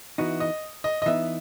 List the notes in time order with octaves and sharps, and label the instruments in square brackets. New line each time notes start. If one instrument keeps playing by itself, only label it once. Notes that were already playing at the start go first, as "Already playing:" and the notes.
[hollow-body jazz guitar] E3 B3 D#4 [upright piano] F#4
[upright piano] D#5
D#5
D#5
[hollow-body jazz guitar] E3 B3 D#4 [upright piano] E5